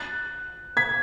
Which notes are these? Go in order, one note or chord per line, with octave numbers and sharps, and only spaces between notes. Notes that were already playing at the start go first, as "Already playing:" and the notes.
Already playing: F#6 A6
G#6 B6